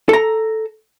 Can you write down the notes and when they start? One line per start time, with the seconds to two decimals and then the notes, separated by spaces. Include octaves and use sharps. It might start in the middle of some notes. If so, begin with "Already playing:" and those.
0.09 A4 A#5